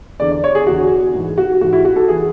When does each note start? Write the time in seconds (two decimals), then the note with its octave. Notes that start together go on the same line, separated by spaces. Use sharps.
0.20 E2 D3 D5
0.32 D5
0.44 C#5
0.55 G#4
0.67 E2 D3 F#4
1.14 G#2 E3
1.38 F#4
1.61 G#2 E3 F#4
1.73 E4
1.85 F#4
1.96 A4
2.08 E3 G#4